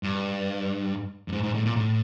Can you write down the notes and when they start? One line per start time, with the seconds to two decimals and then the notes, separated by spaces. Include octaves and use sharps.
0.03 G2
1.28 G2
1.32 G#2
1.43 G#2
1.54 A2
1.66 A#2
1.76 A2